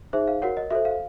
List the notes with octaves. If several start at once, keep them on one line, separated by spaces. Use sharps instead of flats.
D#4 G#4 C5 E5
F5
F#4 A#4 C#5 F#5
D#5
F#4 A4 C5 E5
F5